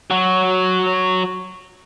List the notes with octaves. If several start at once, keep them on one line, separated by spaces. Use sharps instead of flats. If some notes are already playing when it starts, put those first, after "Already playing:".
F#3 F#4